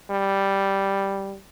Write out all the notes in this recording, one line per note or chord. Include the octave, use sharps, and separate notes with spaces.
G3